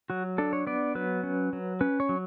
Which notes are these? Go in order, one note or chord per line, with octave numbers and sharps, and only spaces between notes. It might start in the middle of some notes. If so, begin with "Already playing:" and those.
F#3 F#4
D4 A4
C#5
B3 D5
F#3 B4
C#4
F#3
C#4 B4
C#5
F#3